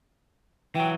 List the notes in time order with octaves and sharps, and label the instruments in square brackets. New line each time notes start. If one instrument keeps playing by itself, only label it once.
[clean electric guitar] E3 F#3 [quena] G5